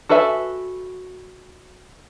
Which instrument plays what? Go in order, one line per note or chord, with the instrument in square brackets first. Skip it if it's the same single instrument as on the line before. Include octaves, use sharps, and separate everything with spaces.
[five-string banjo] F#4 A4 B4 E5 G#5